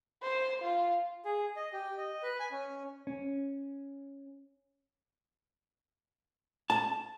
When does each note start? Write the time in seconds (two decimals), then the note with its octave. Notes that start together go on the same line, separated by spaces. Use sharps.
0.23 C5
0.62 F4
1.25 G#4
1.56 D#5
1.73 G4
1.98 D#5
2.23 B4
2.40 G#5
2.51 C#4
3.07 C#4
6.70 A5